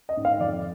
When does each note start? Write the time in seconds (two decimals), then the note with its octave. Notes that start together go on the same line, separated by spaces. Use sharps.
0.09 D#5
0.17 G#2
0.25 F5
0.40 F2 D5